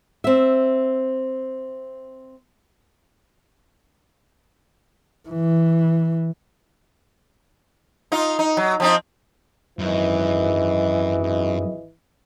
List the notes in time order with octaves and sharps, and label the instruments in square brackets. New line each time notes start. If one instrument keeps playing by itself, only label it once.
[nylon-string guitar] C4 E5
[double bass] E3
[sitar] D#4 F4
D#4
F#3
F3 C4 D#4
[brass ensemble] G#1 D#5 [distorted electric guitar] F#2 [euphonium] E3